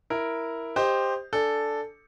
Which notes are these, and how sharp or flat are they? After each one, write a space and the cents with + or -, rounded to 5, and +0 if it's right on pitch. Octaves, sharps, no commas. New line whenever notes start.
E4 +0 A#4 +0
G4 +15 C5 +0 D#5 +0
D4 +0 A4 +0 G#5 +0